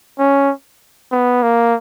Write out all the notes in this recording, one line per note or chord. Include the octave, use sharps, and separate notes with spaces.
C#4
B3
A#3